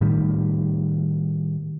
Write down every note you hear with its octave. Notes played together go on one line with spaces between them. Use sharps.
A2 D#3 G3